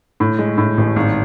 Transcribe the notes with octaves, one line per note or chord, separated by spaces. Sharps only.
A2
G#3
A2
A1
G#1